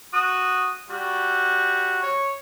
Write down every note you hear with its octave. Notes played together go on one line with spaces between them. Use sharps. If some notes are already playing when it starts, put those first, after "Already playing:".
F#4 D#6
G3 F#4
C#5